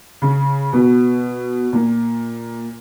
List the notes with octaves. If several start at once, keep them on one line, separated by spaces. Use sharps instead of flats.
C#3
B2
A#2